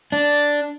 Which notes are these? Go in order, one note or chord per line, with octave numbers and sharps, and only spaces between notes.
D4